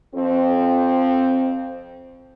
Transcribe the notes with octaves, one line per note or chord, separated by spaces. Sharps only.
F2 C4